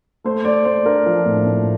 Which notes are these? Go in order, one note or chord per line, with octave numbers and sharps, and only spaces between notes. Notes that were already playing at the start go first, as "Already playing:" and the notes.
A3 C5
A3 D5
A3 C5
D4 A#4
F3
A2
A2